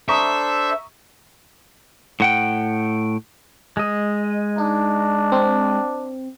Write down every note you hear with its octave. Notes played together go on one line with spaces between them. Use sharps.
D4 A4 C5 E5 A#5 C#6 D#6
A2 F#5 G5
G#3 D#5
D4 D#4
C4